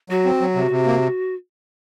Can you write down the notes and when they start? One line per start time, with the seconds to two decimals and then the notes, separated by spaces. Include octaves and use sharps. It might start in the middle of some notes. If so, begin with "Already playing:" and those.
0.10 F#3 F#4
0.25 C4
0.41 F#3
0.55 C3
0.71 C3
0.86 A#3